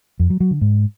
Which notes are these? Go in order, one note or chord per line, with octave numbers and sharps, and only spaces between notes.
F2
F#3
F#3
D3
G#2